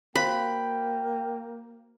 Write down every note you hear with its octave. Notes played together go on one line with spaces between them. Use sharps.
A#3 F#4 C5 F5 G5 B5